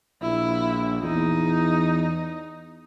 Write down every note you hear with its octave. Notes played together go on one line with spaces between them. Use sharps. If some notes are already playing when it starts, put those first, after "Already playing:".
A#1 E4
E2 D#4